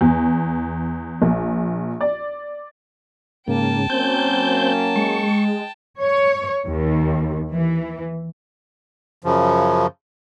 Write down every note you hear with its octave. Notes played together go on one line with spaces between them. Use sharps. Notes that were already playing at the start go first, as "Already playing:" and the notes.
E2
A#1
D5
G#2 C#3 A#3 G5 A5
F#3 A#3 C4 C#4 G6
G#3 C#6
C#5
D#2
E3
F#2 C#3 F3